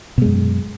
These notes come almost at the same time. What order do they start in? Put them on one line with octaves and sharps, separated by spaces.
B2 G#3 F#2